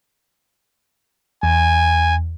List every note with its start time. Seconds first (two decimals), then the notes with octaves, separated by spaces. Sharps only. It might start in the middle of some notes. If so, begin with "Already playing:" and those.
1.43 E2 G#5